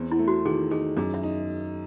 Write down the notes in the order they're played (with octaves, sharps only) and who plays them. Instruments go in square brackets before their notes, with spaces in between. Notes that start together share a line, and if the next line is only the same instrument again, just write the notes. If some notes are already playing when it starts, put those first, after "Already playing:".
Already playing: [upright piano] E2 C4
[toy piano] E4
[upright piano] A3
[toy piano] F#4
[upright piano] D#3 [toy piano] G#4
[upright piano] D#4 [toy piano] G#4
[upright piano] F#2 [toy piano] G#4
[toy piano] E5
[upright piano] D#4